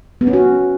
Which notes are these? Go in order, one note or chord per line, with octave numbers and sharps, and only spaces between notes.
B3
C#4
F#4